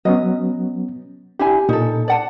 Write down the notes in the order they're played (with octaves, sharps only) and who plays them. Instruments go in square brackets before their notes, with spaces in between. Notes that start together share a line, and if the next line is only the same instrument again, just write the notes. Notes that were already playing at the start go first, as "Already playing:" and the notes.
[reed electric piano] F#3 B3 C#4 [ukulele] D#5
[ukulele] D4 E4 G#5 [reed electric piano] G4
[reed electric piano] A#2 [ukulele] D#4 A4
[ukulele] D5 F#5 A5